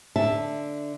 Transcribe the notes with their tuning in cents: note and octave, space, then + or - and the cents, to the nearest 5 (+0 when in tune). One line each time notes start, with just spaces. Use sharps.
D3 +0 E5 +0 A5 +0